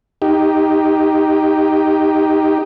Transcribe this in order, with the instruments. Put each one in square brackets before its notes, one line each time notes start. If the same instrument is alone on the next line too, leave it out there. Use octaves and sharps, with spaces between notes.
[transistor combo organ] D#4 G4